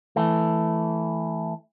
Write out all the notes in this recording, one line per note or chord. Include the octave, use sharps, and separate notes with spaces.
E3 A3